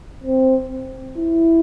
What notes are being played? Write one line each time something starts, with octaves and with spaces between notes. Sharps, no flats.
C4
E4